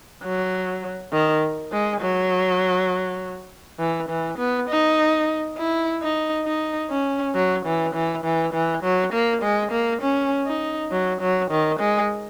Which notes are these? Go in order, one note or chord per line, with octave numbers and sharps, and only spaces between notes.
F#3
D#3
G#3
F#3
E3
E3
B3
D#4
E4
D#4
D#4
C#4
F#3
E3
E3
E3
E3
F#3
A#3
G#3
A#3
C#4
D#4
F#3
F#3
D#3
G#3